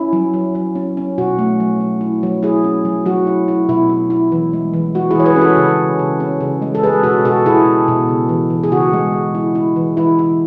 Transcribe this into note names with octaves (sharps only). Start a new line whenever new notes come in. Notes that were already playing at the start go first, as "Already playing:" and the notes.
Already playing: C#4 E4
F#3
F#3
F#3
C#4
C#4
B2 F#4
A3
F#3
F#3
E4
F#3
E4 G#4
C#4
F#3
F#3 F#4
E4
E4
B2 E4
E4
E4
E3
G#3
E3
G#3 F#4
E4 G#4
E3 C#5
G#4 B4
C#4
F#4 A4
C#3
C#3
C#3
C#4
C#3
G#3
A4
G#3 G#4 B4
B2 F#4 A4
B2 F#4 A4
B2 E4 G#4
B2
B2
C#3
E3
E3
G#4
C#3 F#4
G#3
G#3
E4
E4
E3
E3 E4
E4